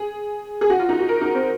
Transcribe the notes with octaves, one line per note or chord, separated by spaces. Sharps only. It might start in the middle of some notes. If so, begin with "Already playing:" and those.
Already playing: G#4
G#4
F#4
F4
D#4
F#4
A#4
D#4
C4